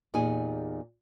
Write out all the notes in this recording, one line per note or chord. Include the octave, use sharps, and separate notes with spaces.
E2 A#2 D#4 G4 G#4 G#5